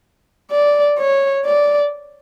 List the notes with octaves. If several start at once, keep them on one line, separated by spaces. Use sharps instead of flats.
D5
C#5
D5